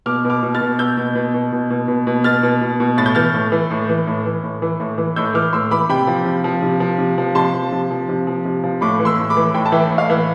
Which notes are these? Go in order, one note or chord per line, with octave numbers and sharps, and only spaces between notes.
B2 D6 F6
B2
D6 F6
B2
F6 A6
B2
B2 E6 G6
B2
B2
B2
B2
B2
B2
B2
B2 F6 A6
B2
B2
B2
A2 A6
G6
E3 F6 A6
A2
E3
A2
E3
A2
E3
A2
E3
A2
E3
A2 E6 G6
E3 D6 F6
A2 C6 E6
E3 B5 D6
C3 G5 B5
F3
C3
F3
C3
F3
C3
F3
C3 A5 C6
F3
C3
F3
C3
F3
C3
F3
A2 B5 D6
E3
C6 E6
A2
B5 D6
E3
A2 G5 B5
A5
E3 E5 G5
A2
F5
E3 E5